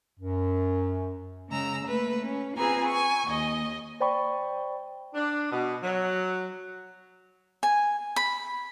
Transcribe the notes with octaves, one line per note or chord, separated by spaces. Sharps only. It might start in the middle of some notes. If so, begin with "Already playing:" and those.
F#2
C#3 G#3 A#5 E6
A3 A#3 B4
C#4
C4 F4 G#4 B4 G#5 A#5
G#5 C#6
D#2 D#5
C5 D5 G5 B5 C#6
D4
B2
F#3
G#5
B5